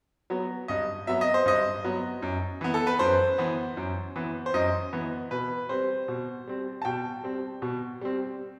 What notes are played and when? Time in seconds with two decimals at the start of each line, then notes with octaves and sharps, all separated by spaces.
0.30 F#3 B3
0.68 G2 D#5
1.07 F#3 B3 E5
1.21 D#5
1.34 C5
1.46 G2 D#5
1.84 F#3 B3
2.22 F#2
2.61 E3 B3
2.74 A4
2.87 B4
2.99 F#2 C5
3.38 E3 B3
3.77 F#2
4.16 E3 B3
4.46 C5
4.54 F#2 D#5
4.93 E3 B3
5.31 B2 B4
5.69 G3 C4 C5
6.08 B2
6.47 G3 C4
6.82 A5
6.85 B2 G5
7.24 G3 C4
7.62 B2
8.01 G3 C4